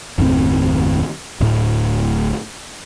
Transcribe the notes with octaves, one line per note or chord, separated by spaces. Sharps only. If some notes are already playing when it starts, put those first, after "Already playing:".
F#1 D#2 A2 C4
D1 A2